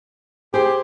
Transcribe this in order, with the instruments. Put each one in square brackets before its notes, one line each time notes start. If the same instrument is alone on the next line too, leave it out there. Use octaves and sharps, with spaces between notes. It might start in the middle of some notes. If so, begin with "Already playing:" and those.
[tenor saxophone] G4 [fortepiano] G#4 [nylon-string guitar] C5